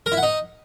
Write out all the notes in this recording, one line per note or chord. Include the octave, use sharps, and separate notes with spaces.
A#4
E4
F#5
D#4